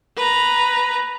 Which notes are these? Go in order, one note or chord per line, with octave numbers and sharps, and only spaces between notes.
B4 A#5